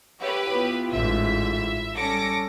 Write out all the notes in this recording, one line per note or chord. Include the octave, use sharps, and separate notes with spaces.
G4 B4 C#5 E5
B3 E4 F4
A1 G#2 E5
G3 C#4 A4 A5 D6 A#6 C#7